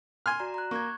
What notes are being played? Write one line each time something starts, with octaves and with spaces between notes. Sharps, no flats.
G#5 C6 F6
F#4 D5 A#5
A#5 F#6
A#3 C#6 G#6